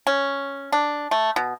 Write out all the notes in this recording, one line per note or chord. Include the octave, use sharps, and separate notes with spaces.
C#4
D4
A3
B2